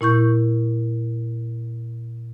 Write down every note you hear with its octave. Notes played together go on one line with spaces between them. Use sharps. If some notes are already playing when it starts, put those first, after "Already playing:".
A#2 E4 C#6 G6